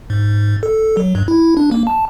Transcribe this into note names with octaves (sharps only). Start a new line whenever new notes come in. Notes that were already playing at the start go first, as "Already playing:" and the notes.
G#2
A4
F#3
G2
E4
D4
A#3
A5